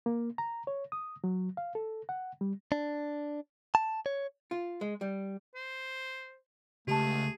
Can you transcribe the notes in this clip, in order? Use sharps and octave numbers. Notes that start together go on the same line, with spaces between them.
A#3
A#5
C#5
D#6
F#3
F5
A4
F#5
G3
D4
A5
C#5
F4
G#3
G3
C5
C#2 A3 G4 G#4 A5